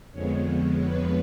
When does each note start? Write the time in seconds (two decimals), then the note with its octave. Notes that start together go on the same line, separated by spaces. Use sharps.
0.12 F2 D3 F3 G#3 B3 C#5
0.81 B4